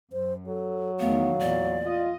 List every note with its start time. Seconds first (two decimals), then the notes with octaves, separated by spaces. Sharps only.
0.13 F#2 C5
0.47 F#3 A4
1.00 E2 D#3 A3 B3 F5
1.40 E2 A#2 D5
1.85 F4 D#5